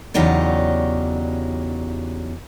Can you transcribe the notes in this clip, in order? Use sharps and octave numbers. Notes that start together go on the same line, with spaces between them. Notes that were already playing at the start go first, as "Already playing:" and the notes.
E2 C#3 F#3 D#4 G4 D5